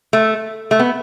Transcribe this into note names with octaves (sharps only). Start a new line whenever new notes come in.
A3
A3
B3